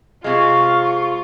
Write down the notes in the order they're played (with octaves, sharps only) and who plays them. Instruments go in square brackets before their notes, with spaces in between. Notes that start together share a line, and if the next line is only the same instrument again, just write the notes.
[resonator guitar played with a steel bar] C3 G#3 [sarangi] F4 [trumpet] F5 [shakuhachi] C#6